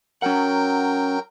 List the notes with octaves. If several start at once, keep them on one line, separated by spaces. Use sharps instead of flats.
F#3 C#4 A#4 F#5 G5